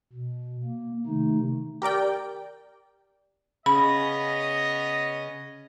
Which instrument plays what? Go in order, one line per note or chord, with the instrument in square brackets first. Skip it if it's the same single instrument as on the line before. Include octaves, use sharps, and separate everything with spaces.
[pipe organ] B2
A#3
C3 D#3 A3 D#4
[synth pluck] G4 A#4 D5 G5
[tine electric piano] C#3 [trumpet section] B3 C#4 D#5 [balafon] B5